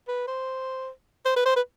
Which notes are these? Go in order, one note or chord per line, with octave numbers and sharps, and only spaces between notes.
B4
C5
C5
B4
C5
B4